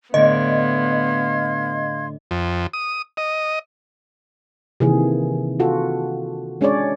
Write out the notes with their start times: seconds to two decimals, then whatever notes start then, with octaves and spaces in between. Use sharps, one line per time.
0.14 A2 D3 B3 D#5 F5 C6 G#6
2.31 F2
2.73 D#6
3.17 D#5
4.80 C3 D#3 E3 A#3 G#4
5.60 F4 F#4 A4
6.61 G#3 C#4 D4 G#4 C#5 D5